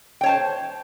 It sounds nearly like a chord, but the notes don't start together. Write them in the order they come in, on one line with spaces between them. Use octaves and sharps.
G5 C#5 A5 C5